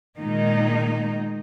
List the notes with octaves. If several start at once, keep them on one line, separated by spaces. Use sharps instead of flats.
A#2 D#3 G#3 A#3 D#4